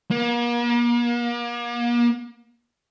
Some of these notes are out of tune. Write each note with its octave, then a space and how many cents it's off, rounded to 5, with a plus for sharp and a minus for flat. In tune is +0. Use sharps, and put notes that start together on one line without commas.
A#3 +40